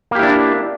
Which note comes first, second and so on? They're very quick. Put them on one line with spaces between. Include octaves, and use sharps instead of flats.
A#3 G4 E4 D4